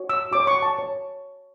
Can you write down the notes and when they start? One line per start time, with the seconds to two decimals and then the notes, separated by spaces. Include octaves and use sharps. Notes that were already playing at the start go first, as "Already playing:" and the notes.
Already playing: F#4 C#5
0.10 E6
0.31 F#4 C#5 D6
0.47 C#6
0.62 A5
0.79 C#5